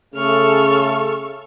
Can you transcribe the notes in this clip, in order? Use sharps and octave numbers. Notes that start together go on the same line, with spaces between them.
C#3 A3 A4 C#6 F6